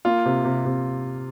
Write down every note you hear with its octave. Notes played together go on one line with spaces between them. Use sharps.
A#3 F4
C3
C3
C3